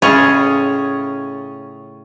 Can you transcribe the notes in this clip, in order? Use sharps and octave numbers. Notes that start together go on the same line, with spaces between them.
A2 C#3 C#4 F4 G#4 D#5